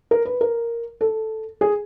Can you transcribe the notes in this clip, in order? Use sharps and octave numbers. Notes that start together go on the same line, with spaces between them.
A#4
B4
A#4
A4
G#4